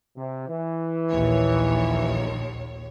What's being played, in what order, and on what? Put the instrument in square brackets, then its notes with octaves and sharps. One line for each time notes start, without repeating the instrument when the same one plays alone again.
[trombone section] C3
E3
[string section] A#1 D#2 C#5